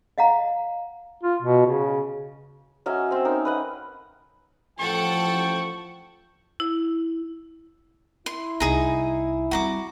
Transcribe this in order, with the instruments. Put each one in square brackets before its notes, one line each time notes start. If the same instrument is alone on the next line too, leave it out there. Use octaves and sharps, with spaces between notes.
[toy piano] D#5 F5 F#5 A#5
[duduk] F4
B2
C#3
[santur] F#3 C#4 D#5 E5
C4 C5
C#4 D#4 A#4
B4 D#5 F#5
[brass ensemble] A1 G5 [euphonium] F3 [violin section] A4 F#5 [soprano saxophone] C#6
[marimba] E4
[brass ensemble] E4 [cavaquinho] C6
[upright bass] C2 [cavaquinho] D#4 G#4 A#5
[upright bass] G3 C4 [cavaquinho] F#4 A#5 D6